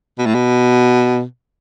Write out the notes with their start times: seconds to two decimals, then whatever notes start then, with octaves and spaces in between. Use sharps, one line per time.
0.18 B2
0.26 A2
0.35 B2